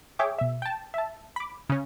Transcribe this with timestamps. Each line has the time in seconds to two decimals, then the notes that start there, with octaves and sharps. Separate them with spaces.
0.19 G#4 C#5 E5 G5 D6
0.38 B2 E5
0.62 G5 A5
0.94 E5 A5
1.36 B5 D6
1.69 C#3 C#4